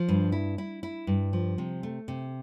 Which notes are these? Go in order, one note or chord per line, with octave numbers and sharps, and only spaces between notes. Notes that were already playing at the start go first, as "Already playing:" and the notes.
Already playing: F3
G2
E4
E4
E4
G2
F3
C3
A3
C3